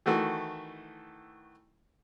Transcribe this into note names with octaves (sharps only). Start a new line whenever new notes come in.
D#3 E3 A3 F#4 A4